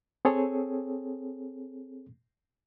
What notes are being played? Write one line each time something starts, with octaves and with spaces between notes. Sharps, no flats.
C4 G#4 A4 C#5